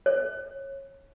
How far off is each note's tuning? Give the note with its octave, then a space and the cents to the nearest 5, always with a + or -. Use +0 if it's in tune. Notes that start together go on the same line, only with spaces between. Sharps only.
C#5 -20